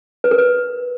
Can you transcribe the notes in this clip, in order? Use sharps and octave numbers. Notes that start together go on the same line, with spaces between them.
B4
A#4
B4